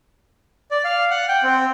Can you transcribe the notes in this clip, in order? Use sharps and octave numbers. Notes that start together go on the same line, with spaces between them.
D5
F5
F#5
G5
C4